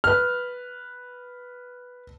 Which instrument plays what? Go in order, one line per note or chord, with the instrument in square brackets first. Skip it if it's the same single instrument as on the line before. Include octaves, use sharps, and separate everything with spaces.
[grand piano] B4 F6